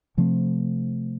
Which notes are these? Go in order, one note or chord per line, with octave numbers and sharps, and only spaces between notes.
C3 F3 A3 C4